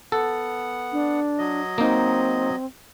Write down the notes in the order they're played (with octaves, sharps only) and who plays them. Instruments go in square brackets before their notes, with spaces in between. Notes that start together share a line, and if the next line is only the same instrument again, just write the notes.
[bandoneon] B3 F#5 [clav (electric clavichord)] A4
[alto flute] D4
[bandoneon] F#3 D#5
[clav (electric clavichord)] A#3 D#4 [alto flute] C4